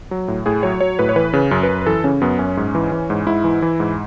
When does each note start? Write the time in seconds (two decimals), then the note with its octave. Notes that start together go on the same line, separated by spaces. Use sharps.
0.11 F#3
0.28 A2
0.46 A2 G#4
0.63 F#3 C#5
0.80 F#3 C#5
0.99 A2 B4
1.09 C#5
1.16 E3 B4
1.33 C#3
1.51 F#2
1.63 B4
1.69 F#2
1.86 E3 A4
2.04 C#3 C#4
2.21 F#2 B3
2.39 F#2 C#4
2.57 G#2
2.75 E3
2.92 E3
3.10 G#2
3.27 G#2 E4
3.44 E3
3.62 E3
3.80 G#2